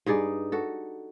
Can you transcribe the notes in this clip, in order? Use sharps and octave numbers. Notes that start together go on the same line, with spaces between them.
G2 D#4 G#4 D5
F#4 A4